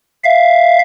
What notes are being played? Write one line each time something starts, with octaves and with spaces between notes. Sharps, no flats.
E5 F5